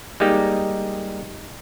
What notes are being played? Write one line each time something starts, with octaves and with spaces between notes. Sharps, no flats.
G3 G#3 A#3 D#4 G4